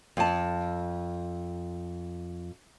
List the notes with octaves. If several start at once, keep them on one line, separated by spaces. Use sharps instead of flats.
F2 A5